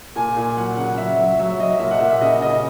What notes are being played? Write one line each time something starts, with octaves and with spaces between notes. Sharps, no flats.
A#2 G#5
A#2
F#3 F#5
C#3 F#5
F#3 E5
F#3
F#3 E5
F#3 D#5
A#2 E5
F#5
A#2 E5
E5
C#3 D#5
C#3 D#5